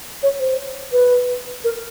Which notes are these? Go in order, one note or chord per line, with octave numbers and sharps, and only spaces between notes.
C#5
C5
B4
A#4